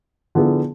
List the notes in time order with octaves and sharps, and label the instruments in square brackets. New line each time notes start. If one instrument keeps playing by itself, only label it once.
[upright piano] D3 F3 B3 E4 G#4